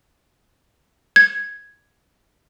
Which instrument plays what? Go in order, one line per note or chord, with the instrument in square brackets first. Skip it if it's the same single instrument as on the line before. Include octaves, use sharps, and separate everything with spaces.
[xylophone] G#6